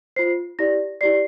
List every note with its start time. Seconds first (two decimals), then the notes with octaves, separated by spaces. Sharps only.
0.16 F4 C5 C7
0.59 E4 G4 D5 A#6
1.01 E4 G4 D5 C7